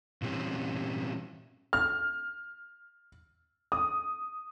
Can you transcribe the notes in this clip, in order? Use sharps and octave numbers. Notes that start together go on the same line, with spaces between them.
A#2 E3 G3 C4 C#4
F6
D#6